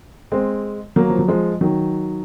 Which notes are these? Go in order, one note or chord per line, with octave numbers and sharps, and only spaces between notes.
G#3 C4
F#3 A#3
F3
F#3
F3 G#3
D#3 F#3